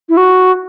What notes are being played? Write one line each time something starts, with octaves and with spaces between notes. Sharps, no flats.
E4
F#4